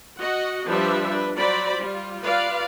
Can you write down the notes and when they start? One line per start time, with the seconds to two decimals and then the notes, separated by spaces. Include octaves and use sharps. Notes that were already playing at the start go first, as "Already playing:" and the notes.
0.20 F#4 D#5 F#5
0.67 F3 G3 D4 G4 B4 E5
1.10 D4 B4
1.38 F#3 F#4 C5 D5 B5
1.77 G3 F4
2.24 F4 B4 D5 F5